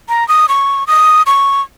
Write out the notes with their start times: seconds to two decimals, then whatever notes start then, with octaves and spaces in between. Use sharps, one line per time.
0.09 A#5
0.28 D#6
0.49 C#6
0.87 D#6
1.26 C#6